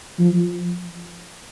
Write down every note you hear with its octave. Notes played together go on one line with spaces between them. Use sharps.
F3